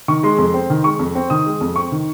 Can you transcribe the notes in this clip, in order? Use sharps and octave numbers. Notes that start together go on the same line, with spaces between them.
D#3 C#6
G#3 C6
F2
C4
D#3
G#3 C#6
F2
C4
D#3 D#6
G#3
F2
C4 C#6
D#3